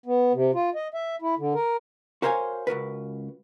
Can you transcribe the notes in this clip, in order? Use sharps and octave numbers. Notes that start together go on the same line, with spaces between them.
B3
C3
F4
D#5
E5
E4
D3
A#4
F#4 A#4 C5 C#5 F5 G#5
C#2 F#4 A#4 B4